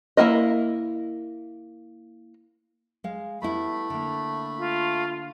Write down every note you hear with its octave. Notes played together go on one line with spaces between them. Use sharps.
A#3 C4 E4 A#4 D#5
G#3 F5
G3 A3 B3 E4 B5
D3 A#3
F4